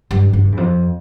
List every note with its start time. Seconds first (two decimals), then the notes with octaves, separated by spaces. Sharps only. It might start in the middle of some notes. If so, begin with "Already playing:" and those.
0.11 G2
0.33 G2
0.52 E2
0.57 F2